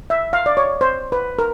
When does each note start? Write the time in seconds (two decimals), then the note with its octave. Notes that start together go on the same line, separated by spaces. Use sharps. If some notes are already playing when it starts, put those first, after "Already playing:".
0.10 E5
0.33 F5
0.46 D5
0.57 C#5
0.81 C5
1.12 B4
1.39 A#4